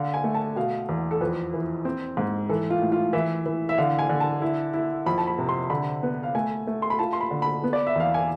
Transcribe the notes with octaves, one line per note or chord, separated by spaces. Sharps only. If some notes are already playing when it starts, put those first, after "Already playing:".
Already playing: D3 F5
G#5
A3
A5
B2 F5
E2
A4
F2 B4
E3
C4
G#2
E3 A4
F4
A2
F4
E3 E5
E3
E5
D3 F5
G#5
D3
A5
E4
E4
F2 B5
A5
B5
C3
C6
D3 B5
B3
F5
A3 G#5
A3
C6
B5
F4 A5
C6
B5
D3
B5
B3
D5
E5
E2 F5
G#5